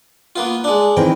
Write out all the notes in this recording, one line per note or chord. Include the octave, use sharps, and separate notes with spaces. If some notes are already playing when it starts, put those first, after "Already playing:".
A#3 B3 F4
G#3 D4
D#3 E3 C4 G5